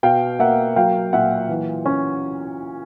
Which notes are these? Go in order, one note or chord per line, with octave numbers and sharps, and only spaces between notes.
B2 F5 G5
A#3 E5 F#5
F#3 F5 G5
A#2 E5 F#5
E3
C#4